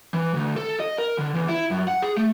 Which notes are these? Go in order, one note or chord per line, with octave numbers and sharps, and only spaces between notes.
E3
D2
A4
D#5
A#4
D3
E2
E4
F#2
F#5
G#4
A3